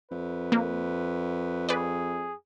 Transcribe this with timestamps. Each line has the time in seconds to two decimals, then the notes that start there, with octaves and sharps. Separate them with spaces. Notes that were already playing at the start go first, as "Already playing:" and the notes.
0.11 F2 B4
0.52 A#3
1.69 G#4 B4 D5